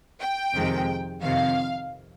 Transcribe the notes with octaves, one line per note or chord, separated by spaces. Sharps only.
G5
F2 C3 D#3 G#3
F2 C3 D#3 F5